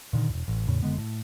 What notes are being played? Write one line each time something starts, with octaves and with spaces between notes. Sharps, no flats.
A#2 D3 D#3
E1 E2
A1
E2 A2 C#3
F#1 D3 G#3 B3
A2